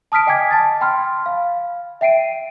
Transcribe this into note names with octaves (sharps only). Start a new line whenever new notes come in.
A5 D#6 F6 B6 D7
D#5 G5 G#5 D6 G#6 B6
A5 A6
G5 B5 C6 F6
F5
E5 G5 C7 D7 D#7